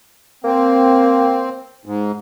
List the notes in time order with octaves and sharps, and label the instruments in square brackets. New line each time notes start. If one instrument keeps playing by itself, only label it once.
[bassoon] A#3 [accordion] C4
[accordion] G#2